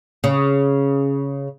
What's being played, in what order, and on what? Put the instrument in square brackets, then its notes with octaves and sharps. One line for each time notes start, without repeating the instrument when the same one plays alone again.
[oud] C#3